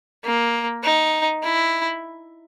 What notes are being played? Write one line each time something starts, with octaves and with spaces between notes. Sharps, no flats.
A#3
D#4
E4